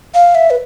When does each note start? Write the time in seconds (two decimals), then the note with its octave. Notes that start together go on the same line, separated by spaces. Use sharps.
0.14 F5
0.35 E5
0.50 B4